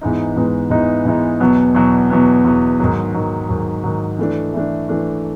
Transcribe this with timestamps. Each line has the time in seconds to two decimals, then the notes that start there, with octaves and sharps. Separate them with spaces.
0.01 G#2 E3 G#3 B3 D#4
0.36 G#2 E3 G#3 B3 D#4
0.70 G#2 E3 G#3 B3 D#4
1.05 G#2 E3 G#3 B3 D#4
1.40 E2 B2 F#3 B3
1.75 E2 B2 F#3 B3
2.10 E2 B2 F#3 B3
2.45 E2 B2 F#3 B3
2.79 G#2 D#3 F#3
3.14 G#2 D#3 F#3
3.49 G#2 D#3 F#3
3.84 G#2 D#3 F#3
4.19 E3 A3 D4
4.54 E3 A3 D4
4.89 E3 A3 D4